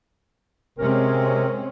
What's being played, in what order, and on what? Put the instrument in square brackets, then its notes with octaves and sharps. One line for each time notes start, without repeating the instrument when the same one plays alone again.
[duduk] C3 [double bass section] G#3 C4 C#4 [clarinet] A#4